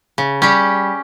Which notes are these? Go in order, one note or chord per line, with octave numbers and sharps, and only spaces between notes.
C#3
G3 C#4 G4